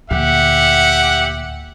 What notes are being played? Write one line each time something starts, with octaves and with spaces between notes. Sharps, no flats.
D2 A#2 G4 E5 F#5